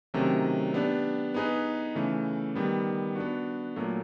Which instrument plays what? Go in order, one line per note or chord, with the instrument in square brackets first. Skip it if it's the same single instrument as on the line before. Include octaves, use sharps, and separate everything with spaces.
[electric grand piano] C3 D#3 F#3 A3 C#4
B3 D4 G4
B3 D#4 G#4 B4
C#3 E3 A3
D#3 G3 B3
B3 D4 F#4
A#2 F#3 A3